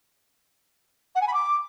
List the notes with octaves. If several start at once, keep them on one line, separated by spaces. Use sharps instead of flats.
F#5
G#5
B5
D6